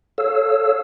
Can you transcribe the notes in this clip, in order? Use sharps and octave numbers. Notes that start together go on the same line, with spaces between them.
A4 C#5 F5 E6